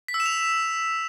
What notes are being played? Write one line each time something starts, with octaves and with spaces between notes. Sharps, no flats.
B6
E6
E7
F7